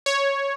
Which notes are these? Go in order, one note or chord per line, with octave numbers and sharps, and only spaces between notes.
C#5